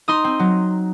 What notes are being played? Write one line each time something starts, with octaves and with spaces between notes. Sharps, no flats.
D#4 C6 D#6
C4
F#3